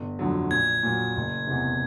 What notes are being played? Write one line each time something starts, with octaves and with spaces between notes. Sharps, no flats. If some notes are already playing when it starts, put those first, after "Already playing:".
Already playing: G1
F2 D3 F#3
A#1 G#6
A#2 F#3
F#1
E2 C3